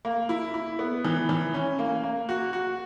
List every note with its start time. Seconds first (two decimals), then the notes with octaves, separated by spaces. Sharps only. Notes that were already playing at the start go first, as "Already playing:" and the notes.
0.05 A#3
0.29 E4
0.54 E4
0.79 B3
1.05 E3
1.29 E3
1.54 C#4
1.79 A#3
2.03 A#3
2.29 F#4
2.53 F#4